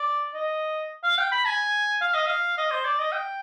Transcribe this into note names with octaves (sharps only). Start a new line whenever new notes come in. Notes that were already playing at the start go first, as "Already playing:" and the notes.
Already playing: D5
D#5
F5
G5
B5
G#5
F5
D#5
F5
D#5
C5
D5
D#5
G5